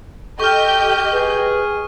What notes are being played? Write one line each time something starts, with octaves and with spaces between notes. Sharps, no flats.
G4 A4 D#5 C#6 F6 G6
G#4 B4